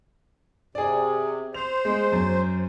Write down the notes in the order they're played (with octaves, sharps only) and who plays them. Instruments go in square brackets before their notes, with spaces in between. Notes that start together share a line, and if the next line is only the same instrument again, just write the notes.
[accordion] C3 [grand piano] G#4 D5
[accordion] C5 [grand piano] F7
[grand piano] G#3
F#2